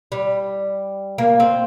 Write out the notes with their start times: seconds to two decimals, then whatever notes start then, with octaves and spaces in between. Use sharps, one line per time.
0.12 G3
1.18 A#3
1.40 C4